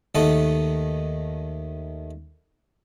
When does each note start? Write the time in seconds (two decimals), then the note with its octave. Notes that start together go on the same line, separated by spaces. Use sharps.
0.15 D#2 D#3 A3 D#5 F#5 A5